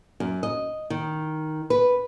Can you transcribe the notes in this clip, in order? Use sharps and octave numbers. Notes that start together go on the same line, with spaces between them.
F#2
D#5
D#3
B4